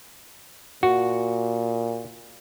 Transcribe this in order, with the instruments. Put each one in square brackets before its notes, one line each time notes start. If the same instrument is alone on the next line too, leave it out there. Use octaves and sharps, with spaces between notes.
[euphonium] A#2 [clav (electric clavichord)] F#4